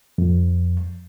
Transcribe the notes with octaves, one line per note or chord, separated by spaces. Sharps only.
F2